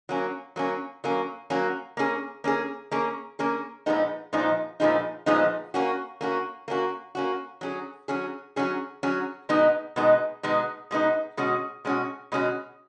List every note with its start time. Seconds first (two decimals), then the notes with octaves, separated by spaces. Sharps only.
0.09 F#3 A#3 C#4
0.56 F#3 A#3 C#4
1.04 F#3 A#3 C#4
1.50 F#3 A#3 C#4
1.97 A#3 C#4 G#4
2.44 A#3 C#4 G#4
2.91 A#3 C#4 G#4
3.39 A#3 C#4 G#4
3.86 A#2 F3 G#3 B3 D#4
4.33 A#2 F3 G#3 B3 D#4
4.80 A#2 F3 G#3 B3 D#4
5.26 A#2 F3 G#3 B3 D#4
5.74 A#3 C#4 F#4
6.21 A#3 C#4 F#4
6.68 A#3 C#4 F#4
7.15 A#3 C#4 F#4
7.61 F#3 C#4 G#4
8.08 F#3 C#4 G#4
8.56 F#3 C#4 G#4
9.03 F#3 C#4 G#4
9.49 B2 G#3 B3 D#4
9.96 B2 G#3 B3 D#4
10.43 B2 G#3 B3 D#4
10.91 B2 G#3 B3 D#4
11.37 B2 G#3 C#4 F#4
11.85 B2 G#3 C#4 F#4
12.32 B2 G#3 C#4 F#4